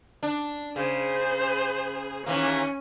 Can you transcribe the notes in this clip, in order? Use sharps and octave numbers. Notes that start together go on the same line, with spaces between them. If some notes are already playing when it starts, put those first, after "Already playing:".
D4
C#3 G#4 C5
D#2 E3 A#3 C#4